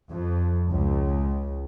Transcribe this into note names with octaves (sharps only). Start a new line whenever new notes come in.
F2
C#2